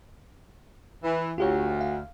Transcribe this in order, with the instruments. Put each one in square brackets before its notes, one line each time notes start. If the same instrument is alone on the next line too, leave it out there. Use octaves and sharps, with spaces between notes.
[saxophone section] E3
[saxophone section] D2 [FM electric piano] F4 G4 C#5
[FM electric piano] F5